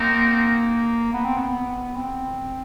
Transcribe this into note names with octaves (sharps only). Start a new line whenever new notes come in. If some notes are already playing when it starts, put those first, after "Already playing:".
Already playing: A#3 C4 D#4 F#4 A#4
B3
C4
B3
C4